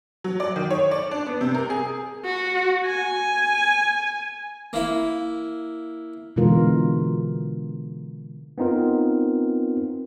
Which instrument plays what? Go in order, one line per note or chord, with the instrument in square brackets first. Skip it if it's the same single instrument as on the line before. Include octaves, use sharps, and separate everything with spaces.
[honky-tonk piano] F#3
D5
D#3
C#5
D5
D4
B3
C3
A#4
G#4
[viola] F#4
G#5
[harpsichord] A#3 E4
[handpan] B2 D3 E3 G#3 F4 A#4
[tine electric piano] B3 C4 D#4 F4 A#4